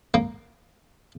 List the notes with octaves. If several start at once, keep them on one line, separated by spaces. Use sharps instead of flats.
A#3